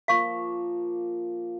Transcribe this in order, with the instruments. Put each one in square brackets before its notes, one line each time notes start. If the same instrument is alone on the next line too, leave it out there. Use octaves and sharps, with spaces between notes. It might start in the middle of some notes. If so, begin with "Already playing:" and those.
[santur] F3 A#3 [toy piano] F5 C#6